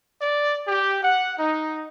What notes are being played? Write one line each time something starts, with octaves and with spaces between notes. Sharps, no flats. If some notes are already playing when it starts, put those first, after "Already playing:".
D5
G4
F#5
D#4